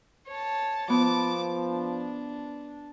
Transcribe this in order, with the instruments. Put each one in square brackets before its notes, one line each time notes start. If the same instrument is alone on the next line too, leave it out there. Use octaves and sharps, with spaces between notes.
[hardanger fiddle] C#5 A5
[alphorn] F3 [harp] B3 [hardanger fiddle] A5 D6
[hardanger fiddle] D4